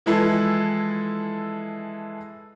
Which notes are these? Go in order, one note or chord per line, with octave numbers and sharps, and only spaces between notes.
E3 F3 G#3 E4 A4 B4